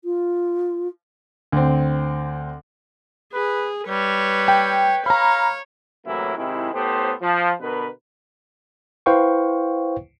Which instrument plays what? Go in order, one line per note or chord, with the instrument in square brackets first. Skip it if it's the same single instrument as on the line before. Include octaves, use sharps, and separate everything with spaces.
[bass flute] F4
[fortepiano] D2 C4
[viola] G#4 [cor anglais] B4
[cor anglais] G3 [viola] B4 C#5
[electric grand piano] G5
[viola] C#5 [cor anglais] F5 [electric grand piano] A#5 B5
[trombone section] A2 C3 E3 F#3 A#3 E4
C3 D#3 G#3 E4
A2 B3 G4 A4 C5
F3
B2 D3 A#4 B4
[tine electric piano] E4 B4 C5 F5 G5 C#6